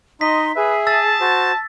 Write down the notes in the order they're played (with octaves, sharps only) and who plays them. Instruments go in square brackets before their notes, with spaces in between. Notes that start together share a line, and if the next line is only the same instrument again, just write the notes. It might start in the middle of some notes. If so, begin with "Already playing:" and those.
[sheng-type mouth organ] D#4 [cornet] D#5 [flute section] C6 [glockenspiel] B6
[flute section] G#4 [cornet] B4 [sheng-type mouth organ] E5
[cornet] A5 [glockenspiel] E6 A6
[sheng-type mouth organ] F#4 C5